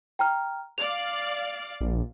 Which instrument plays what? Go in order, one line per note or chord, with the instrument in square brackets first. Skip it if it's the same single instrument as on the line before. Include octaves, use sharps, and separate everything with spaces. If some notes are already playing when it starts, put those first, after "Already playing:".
[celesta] G5 A#5 F6
[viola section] D5 F5 [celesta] F7
[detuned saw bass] A#1